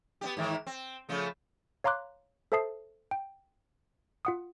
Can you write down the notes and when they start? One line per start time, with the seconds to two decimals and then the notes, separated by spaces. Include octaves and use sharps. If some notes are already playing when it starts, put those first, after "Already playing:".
0.21 B3 D4 G4
0.37 G#2 D#3 E3
0.67 C4
1.09 C#3 F3 A3
1.84 C#5 F5 A#5 C6 D6 F#6
2.52 A4 C5 E5 A5 D#6 C7
3.11 G5
4.25 F4 F#5 D#6